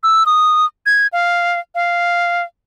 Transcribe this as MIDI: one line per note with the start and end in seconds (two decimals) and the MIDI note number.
0.03 0.26 88
0.26 0.66 87
0.86 1.07 92
1.13 1.59 77
1.75 2.43 77